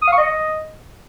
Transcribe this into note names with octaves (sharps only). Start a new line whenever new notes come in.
D#6
F5
C#6
D#5